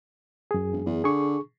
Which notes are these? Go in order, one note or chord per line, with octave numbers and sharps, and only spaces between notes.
F#2 G#4
E1
E2
D3 G#4 C#6